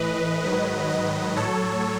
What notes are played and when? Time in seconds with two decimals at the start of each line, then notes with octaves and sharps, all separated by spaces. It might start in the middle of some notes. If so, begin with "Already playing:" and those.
Already playing: A2 E3 B4 D#5
0.44 G#2 D#3 F#3
0.90 B4 D#5
1.36 A2 F#3 A4 C#5